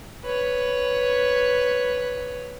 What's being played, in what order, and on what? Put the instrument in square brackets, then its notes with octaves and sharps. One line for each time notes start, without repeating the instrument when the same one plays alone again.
[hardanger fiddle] B4 C#5